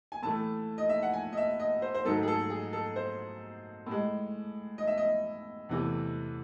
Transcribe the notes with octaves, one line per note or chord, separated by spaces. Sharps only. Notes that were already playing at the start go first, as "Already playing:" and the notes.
G#5
A2 E3 A3 A5
D#5
E5
F#5
G#5
D#5
E5
D#5
C5
C5
G#2 D#3 F#3 A3 A4
G#4
A4
G#4
A4
C5
A2 G#3
D#5
E5
D#5
E2 C3 E3 A3